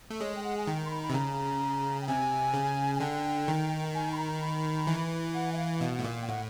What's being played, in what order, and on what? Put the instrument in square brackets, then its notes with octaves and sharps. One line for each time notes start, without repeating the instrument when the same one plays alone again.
[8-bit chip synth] A3
[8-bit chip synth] G#3 [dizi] C#5
[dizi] G5
F#5
G#5
[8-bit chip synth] D#3 [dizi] G5
[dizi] C6
B5
B5
[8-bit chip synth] C3
[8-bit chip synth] C#3 [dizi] A#5
[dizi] G5
[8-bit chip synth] C3 [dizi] G#5
[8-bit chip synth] C#3
[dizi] G#5
[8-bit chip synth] D3 [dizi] G5
[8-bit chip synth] D#3
[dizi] G#5
B5
A#5
B5
[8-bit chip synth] E3
[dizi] F#5
E5
F5
[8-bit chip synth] B2 [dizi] F5
[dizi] F#5
[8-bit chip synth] A2
[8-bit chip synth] A#2 [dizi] F5
[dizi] G5
[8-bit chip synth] A2 [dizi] F#5